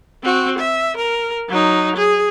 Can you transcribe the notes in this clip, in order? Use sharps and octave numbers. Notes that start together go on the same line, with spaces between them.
C4 F#4
E5
A#4
F#3 D#4
G#4